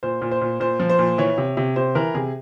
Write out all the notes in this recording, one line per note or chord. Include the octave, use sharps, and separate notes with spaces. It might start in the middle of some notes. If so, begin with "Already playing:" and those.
A#2 C5
A#2
C5
A#2
A#2 C5
F3
C5
A#2
E3 C#5
C3
C3
C3 C5
E3 A#4
C3 G#4